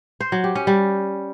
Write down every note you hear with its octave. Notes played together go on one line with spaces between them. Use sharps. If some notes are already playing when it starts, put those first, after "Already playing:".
C5
F#3
G4
C#4
G3